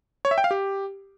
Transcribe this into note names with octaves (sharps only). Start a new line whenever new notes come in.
C#5
E5
G5
F5
G4